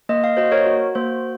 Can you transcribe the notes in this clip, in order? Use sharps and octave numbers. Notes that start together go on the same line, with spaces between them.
A#3 D#5
F5
F#4 C5 D#5
A#4 C#5
F#4
A#3 C5